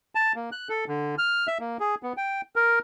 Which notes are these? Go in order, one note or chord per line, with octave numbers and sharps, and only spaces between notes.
A5
A#3
F#6
A4
D3
F6
E5
A#3
G#4
B3
G5
A#4